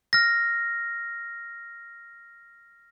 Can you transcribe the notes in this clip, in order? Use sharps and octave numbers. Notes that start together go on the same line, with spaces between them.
F6 A#6